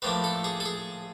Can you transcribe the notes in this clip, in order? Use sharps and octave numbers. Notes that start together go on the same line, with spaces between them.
A2 F3 A#3 D4 B4
A4
G#4
A4
G#4